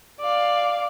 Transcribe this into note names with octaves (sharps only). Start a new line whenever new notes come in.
D5 F5